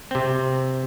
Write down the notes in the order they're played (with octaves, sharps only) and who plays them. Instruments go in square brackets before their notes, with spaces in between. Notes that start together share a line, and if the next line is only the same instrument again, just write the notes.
[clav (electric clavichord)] C3 C4